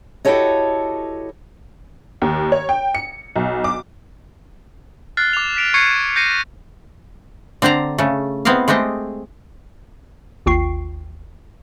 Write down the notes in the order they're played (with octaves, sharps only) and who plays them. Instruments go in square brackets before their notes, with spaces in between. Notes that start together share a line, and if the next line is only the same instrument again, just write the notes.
[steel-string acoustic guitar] E4 F#4 G4 A4 C#5 D#5
[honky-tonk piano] D#2
C#5
G5
C#7
B1
D6
[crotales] F6 F#6 A6 C7
D6 F7
B6 D7 F7
C#6 G#6 C7 C#7 D#7
G6 A#6 C7 C#7 D#7
[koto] D3 C4 C5 D5 A#5
C#3 A3
B3 C4 E4 D#5 F5
G#3 A3 C4 G4 D#5
[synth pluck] G#1 D#2 F4 G5 C#6 C7